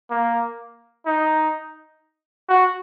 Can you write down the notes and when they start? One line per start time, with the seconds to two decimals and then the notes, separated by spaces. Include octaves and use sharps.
0.10 A#3
1.06 D#4
2.49 F#4